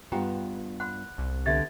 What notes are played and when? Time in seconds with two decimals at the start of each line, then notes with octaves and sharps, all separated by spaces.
0.12 G2 B3 F4 G4 G5 A#5
0.80 F#5 B5 C6 F#6
1.18 C2
1.46 D3 B3 G4 E5 G#6 A6